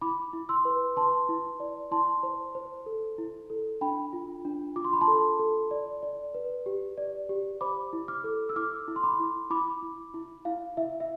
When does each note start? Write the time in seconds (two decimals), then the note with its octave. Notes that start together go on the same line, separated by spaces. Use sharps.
0.01 E4 B5 D6
0.33 E4
0.49 C6 E6
0.65 B4
0.96 B4 A5 C6
1.29 E4
1.60 D5
1.91 E4 A5 C6
2.23 C5
2.55 C5
2.86 A4
3.18 E4
3.50 A4
3.81 D4 G5 B5
4.13 F4
4.45 D4
4.76 F4 D6
4.85 C6
4.93 B5
5.01 A5 C6
5.08 A4
5.39 A4
5.71 D5
6.02 D5
6.34 B4
6.66 G4
6.98 D5
7.29 G4
7.61 C5 B5 D6
7.93 E4
8.08 D6 F6
8.24 A4
8.49 E6
8.56 E4 D6 F6
8.88 E4
8.96 C6
9.03 B5 D6
9.19 E4
9.50 E4 B5 D6
9.82 E4
10.14 E4
10.45 E4 F5
10.77 E4 E5
11.00 E5